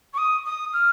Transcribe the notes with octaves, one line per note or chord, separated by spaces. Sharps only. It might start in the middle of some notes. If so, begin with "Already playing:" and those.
C#6
D#6
D#6
F6